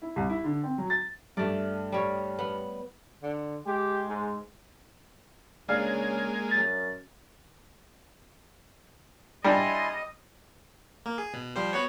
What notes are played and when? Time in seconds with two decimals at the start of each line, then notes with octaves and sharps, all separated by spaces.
0.02 E4
0.16 C2
0.30 E4
0.44 D3
0.63 C4
0.78 F#3
0.90 A6
1.37 G2 A3 D5
1.92 G3 C#5
2.39 B3
3.23 D3
3.66 G#3 G4
4.08 G#2
5.68 C#3 G#3 A#3 D4 G#4 F5
6.51 F#2 A6
9.44 G3 D4 E4 D#5 G#5 C6
11.06 A#3
11.18 G#4
11.34 B2
11.55 F3 G3 C5
11.73 B3 F#4 C#5